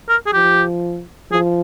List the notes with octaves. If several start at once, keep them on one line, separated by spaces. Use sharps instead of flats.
A#4
G#4
F3 G4
F3 G#4